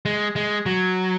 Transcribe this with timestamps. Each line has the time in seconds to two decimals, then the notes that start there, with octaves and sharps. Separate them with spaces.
0.05 G#3
0.36 G#3
0.66 F#3